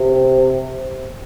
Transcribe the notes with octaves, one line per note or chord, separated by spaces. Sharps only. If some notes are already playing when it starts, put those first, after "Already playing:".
Already playing: C3